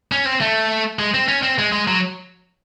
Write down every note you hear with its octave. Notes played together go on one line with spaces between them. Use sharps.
C#4
C4
A3
G#3
C4
C#4
C4
G#3
G#3
F#3